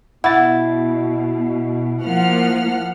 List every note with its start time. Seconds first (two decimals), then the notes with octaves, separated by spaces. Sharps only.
0.24 B2 E4 F#5 A6
2.03 F3 A#3 F#5 F6